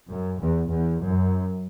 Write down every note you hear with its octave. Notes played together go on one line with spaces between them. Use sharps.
F#2
E2
E2
F#2